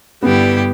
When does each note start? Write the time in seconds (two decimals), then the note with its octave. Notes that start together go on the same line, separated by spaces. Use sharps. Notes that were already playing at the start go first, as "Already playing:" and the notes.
0.22 G2 D3 G3 B3 E4 G4